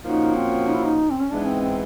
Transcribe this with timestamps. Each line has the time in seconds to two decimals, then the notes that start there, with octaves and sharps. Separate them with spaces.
0.03 A#2 F3 A#3 C#4 D#4 F#4
0.35 C4
0.67 D#4
0.75 E4
0.84 D#4
1.11 C4
1.20 C#4
1.30 G#2 E3 G#3 B3 D4 D#4
1.46 C4
1.62 C4